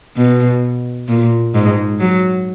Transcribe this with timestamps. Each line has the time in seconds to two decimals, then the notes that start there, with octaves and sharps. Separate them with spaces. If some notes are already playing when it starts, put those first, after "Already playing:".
0.16 B2
1.08 A#2
1.55 G#2
1.99 F#3